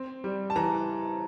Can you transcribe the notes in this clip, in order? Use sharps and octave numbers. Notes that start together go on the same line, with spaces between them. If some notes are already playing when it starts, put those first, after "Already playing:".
Already playing: C4
G3
A5
E3 A#5